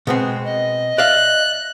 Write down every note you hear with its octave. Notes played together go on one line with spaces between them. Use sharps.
B2 G#3 B3 C4
D#5
D5 E5 F5 F#6